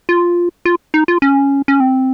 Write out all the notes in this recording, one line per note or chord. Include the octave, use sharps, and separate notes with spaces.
F4
F4
D#4
F4
C#4
C#4
C4